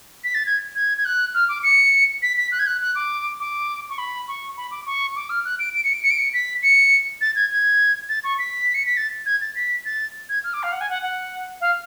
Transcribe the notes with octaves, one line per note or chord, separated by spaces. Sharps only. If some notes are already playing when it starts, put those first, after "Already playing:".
B6
A6
G#6
G#6
G#6
F#6
F6
D6
C#7
B6
B6
F#6
G#6
F#6
F#6
D6
D6
C#6
B5
C#6
B5
D6
C#6
D6
F6
F#6
D7
D7
C#7
D7
C#7
D7
C#7
B6
C#7
A6
G#6
G#6
A6
C#6
B6
C#7
B6
A6
G#6
A6
B6
A6
G#6
F6
D6
F5
F#5
G#5
F#5
F#5
F5